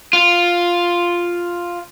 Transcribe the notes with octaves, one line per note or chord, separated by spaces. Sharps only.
F4